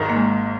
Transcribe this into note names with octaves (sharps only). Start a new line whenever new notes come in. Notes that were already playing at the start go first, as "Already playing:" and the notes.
Already playing: G#1 G#2 D#3
A#3
G#3